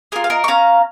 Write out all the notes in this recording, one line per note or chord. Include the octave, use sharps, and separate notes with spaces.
F4 G#4 A#4
F5
A#4 D#5
C#6
C#4 F5 A#5